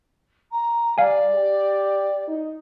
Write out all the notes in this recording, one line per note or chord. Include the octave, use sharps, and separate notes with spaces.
A#5
G3 D5 F5 G#5
G4
D#4